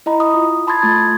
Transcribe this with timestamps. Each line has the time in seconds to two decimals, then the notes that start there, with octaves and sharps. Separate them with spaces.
0.06 E4 D#5 A#5 B5
0.20 D#6
0.34 F4
0.67 A5 B5 C6 D#6 G#6 A6
0.83 A3 F4 G#6